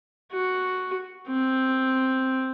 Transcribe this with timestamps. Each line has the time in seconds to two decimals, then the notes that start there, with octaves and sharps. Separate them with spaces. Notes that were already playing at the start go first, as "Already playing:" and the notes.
0.33 F#4
1.29 C4